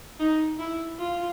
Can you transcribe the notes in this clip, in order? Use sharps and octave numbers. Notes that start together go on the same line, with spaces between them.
D#4
E4
F4